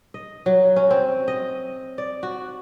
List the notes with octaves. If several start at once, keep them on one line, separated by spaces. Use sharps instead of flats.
D#5
F#3
C#4
C4
D#5
D5
F#4